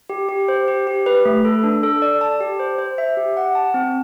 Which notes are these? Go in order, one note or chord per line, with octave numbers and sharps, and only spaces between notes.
G4
G4
C5
G4
G4
B4
A3
A4
D4
A4
D5
A5
G4
C5
C5
E5
G4
F#5
A5
C4